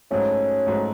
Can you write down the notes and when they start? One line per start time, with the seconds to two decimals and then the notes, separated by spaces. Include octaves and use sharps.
0.11 G#2 F#3 A3 C#4
0.67 G#2 F#3 A3